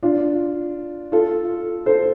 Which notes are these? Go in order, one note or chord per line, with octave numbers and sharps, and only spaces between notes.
D4 F4
F4 A4
A4 C5